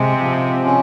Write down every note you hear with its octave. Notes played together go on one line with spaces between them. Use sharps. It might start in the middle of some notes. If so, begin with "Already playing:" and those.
Already playing: C3 G#3
F3
C#4